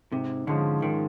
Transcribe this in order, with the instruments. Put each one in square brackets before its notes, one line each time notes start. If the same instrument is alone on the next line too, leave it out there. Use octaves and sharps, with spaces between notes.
[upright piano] G#2 [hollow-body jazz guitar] C3
[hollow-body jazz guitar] D3 [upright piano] F3 G#3 C#4
[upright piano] G#2 [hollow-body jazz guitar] D#3